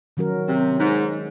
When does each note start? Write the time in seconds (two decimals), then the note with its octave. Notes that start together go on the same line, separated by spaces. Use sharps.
0.17 D#3 F#3 C#4 F#4 A#4
0.48 C3
0.79 G#2